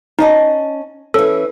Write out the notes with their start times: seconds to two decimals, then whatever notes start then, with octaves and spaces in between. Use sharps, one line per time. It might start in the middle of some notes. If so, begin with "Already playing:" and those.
0.19 C#4 D#4 D#5 A5
1.14 E3 C#4 A4